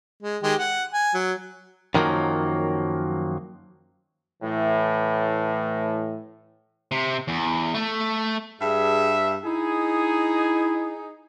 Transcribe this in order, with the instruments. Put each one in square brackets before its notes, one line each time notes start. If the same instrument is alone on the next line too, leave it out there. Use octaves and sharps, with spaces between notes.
[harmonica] G#3
D#3 G#3 G4
F#5
G#5
F#3
[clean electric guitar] F#2 D#3 F3 F#3 A#3
[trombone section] A2 E3
[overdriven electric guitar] C3
E2
A3
[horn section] G2 E5 [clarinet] G#4
[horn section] D#4 G#4 [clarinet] E4